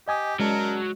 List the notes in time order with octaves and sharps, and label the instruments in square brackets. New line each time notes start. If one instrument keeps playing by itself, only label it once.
[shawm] G4 [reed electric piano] D#5 G#5 D#6
[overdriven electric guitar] F#3 [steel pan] G#3 [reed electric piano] C#4 D5 A5 [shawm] A#4